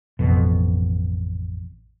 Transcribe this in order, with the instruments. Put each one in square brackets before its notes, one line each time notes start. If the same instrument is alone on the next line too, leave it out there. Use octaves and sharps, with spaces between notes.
[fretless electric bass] A1 F2 B2